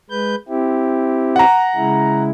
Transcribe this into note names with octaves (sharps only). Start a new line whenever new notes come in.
G#3 B4 G6
C4 E4 G4
F#5 A#5
C#3 G#3 E4